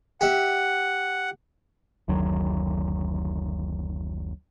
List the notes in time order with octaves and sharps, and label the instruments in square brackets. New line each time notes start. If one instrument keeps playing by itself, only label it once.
[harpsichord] G4 E5 [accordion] F#5
[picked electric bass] F#1 D2 D#3 F#3